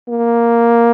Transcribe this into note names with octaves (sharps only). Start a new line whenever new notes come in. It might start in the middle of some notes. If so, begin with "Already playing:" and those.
A#3